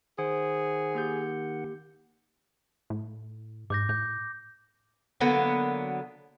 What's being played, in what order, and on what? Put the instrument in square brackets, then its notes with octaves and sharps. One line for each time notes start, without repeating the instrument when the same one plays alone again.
[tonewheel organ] D#3 F#5 [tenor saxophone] G#4 [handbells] C5
[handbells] A#3 G4 G6
[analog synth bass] A2
[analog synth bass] G#2 [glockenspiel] D6 G6 A#6
[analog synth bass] A2 [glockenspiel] G6
[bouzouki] D3 F#3 A#3 B3